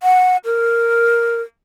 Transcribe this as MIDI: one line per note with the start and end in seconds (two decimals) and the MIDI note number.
0.03 0.37 78
0.45 1.42 70